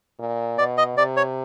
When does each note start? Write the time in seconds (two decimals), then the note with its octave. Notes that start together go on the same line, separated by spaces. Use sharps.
0.19 A#2
0.58 B2 D5
0.78 D#5
0.97 C3 D5
1.17 C#5